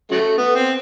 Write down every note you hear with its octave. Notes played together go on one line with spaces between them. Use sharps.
C#3 F#3 A3
B3
C4